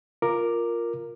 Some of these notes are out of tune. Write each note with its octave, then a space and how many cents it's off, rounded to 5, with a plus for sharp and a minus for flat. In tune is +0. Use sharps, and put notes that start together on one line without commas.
F4 +0 A#4 +0 D6 +10